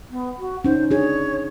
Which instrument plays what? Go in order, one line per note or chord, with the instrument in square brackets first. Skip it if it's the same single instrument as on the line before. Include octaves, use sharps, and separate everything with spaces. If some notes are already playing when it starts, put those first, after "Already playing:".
[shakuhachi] B3
F#4
[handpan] C#4 D#4 [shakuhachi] C5
[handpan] D4 G#4 [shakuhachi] C#5